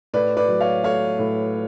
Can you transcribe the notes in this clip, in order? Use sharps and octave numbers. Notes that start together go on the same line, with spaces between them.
A2 B4 D5
B4 D5
F#3
C#5 F5
A3 C#5 F5
A2